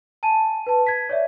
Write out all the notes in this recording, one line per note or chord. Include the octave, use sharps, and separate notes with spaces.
G#5 A5 D#7
B4 A5
G#6 B6
C#5 D5 E5